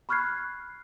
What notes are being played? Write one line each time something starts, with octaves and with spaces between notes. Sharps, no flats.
B5 C#6 F6 F#6 G#6 C7